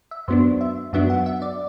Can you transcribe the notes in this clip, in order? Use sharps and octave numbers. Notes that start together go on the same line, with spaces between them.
E5
F#2 F#3 B3 D4 C5
E5
F#2 F#3 B3 D4 E5
F#5
E5
D5